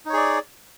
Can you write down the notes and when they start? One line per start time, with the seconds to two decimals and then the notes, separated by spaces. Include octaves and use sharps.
0.06 D#4
0.09 C#5
0.13 G#4
0.17 D5